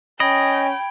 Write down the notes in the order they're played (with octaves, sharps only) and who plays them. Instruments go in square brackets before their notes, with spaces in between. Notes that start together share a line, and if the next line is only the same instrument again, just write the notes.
[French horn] C#4 [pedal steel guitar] D#5 [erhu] G5 [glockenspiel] B5 G#6 D7